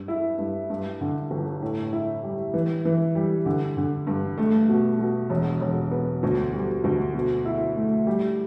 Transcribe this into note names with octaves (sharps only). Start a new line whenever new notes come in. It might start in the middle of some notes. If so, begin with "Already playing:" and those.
Already playing: G2
E4
G2
G2
D3
G1
A2
E4
G3
E3
E3
G3
D3
D3
G2
A3
B2
B2
E1
E1
B3
D2
G3
D2
B2
E4
A3
G3